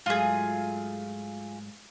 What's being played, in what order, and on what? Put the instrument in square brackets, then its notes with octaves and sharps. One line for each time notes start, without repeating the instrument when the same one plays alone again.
[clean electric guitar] G#2 F#3 A3 [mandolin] F4 G#4